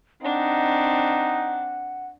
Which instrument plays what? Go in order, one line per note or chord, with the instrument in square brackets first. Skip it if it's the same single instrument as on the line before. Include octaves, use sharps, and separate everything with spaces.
[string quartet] C4 D4 [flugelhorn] D#4 [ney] F#5